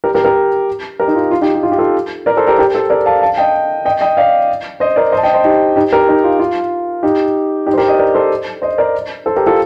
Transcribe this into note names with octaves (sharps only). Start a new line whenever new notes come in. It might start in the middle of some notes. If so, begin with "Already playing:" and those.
G4 A#4
G4 A#4
G4 A#4
G4 A#4
D#4
F4
F4
D#4 G4
G4
F4
G4
F4 A4
A#4 D5
A4 C5
G4 A#4
G4 A#4
A4 C5
A#4 D5
F5 A5
F5 A5
D#5 G5
D#5 G5
D#5 G5
D5 F5
C5 D#5
A#4 D5
C5 D#5
A5
D#5 G5
C5 D#5
D#4 G4
D#4 G4
G4 A#4
D#4 G4
F4
F4
D#4 G4
D#4 G4
C5
G4 A#4
D#5 G5
A#4 D5
A4 C5
C5 D#5
A#4 D5
A4 C5
G4 A#4
F4 A4